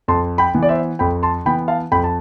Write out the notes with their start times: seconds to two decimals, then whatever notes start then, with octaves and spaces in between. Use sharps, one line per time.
0.08 F2 A5 C6
0.38 G5 B5
0.54 E3 B3
0.63 D5
0.69 C5 E5
0.99 F2 G5 B5
1.23 A5 C6
1.45 E3 B3 G5 B5
1.68 F5 A5
1.92 F2 G5 B5
2.04 A5